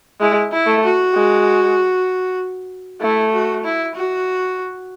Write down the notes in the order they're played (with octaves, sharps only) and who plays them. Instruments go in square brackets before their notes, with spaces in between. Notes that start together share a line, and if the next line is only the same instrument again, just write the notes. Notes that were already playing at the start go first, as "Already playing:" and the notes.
[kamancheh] G#3 [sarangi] E4
[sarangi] E4
[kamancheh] A3
[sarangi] F#4
[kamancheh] G#3
[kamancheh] A3 [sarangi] E4
[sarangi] F#4
E4
F#4